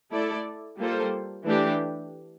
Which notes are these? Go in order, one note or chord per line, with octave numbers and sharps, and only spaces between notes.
A3 E4 A4 D5
G3 A#3 F4 A4 C5
E3 A3 D4 G4